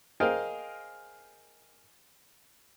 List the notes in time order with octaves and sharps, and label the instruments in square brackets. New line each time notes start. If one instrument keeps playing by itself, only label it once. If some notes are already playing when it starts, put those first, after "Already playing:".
[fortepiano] G#4 A#4 C5 D#5 F5 G5